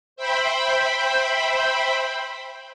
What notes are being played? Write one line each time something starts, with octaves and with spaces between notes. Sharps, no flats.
C5 E5 G5 B5